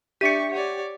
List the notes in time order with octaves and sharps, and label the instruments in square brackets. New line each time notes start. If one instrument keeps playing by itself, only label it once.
[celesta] D4 E5 D#7 [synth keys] G4 [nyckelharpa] D5 C#6 [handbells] B6 C#7
[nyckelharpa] C#5 D5 [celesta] F#5